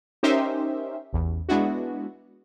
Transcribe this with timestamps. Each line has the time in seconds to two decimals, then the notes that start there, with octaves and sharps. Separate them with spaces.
0.23 C#4 D#4 G4 A#4 C5 E5
1.13 A1 E2
1.49 G#3 B3 D4 E4 F#4